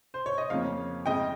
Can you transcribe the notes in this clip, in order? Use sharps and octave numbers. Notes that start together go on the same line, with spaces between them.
C5
C#5
D#5
F2 C#3 F3 A#3 C#5 F5
F2 C#3 G#3 D#5 G5